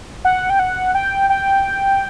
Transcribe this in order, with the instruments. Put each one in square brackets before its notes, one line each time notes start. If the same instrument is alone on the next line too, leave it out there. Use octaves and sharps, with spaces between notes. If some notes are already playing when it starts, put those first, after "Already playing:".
[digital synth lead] F#5
G5
F#5
G5
G5